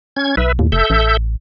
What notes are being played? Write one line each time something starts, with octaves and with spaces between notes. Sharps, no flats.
C#4 G#6
B1 B4 E5
D#2 A2
F1 A4 E5 G6
A1